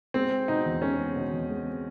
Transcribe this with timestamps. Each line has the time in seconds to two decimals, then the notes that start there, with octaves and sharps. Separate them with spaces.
0.14 G#3 C4
0.31 C4
0.48 B2 D#4
0.66 E2
0.81 G#3 C#4
0.99 C4
1.16 B2
1.32 E2
1.50 G#3
1.66 C4